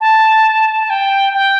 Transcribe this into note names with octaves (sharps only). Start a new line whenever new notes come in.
A5
A5
G5
G5